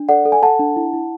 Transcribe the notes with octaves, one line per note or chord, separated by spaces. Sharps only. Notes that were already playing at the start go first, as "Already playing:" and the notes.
Already playing: D4
A4 D5 F#5
A4
G#5
A4 F#5 A5
D4
E4
E4